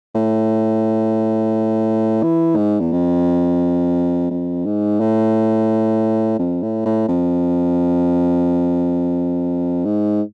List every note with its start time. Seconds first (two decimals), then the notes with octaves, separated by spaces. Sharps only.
0.15 A2
2.23 E3
2.57 G#2
2.80 E2
2.92 F2
4.31 F2
4.65 G#2
5.00 A2
6.39 F2
6.62 A2
6.86 A2
7.08 F2
9.85 G#2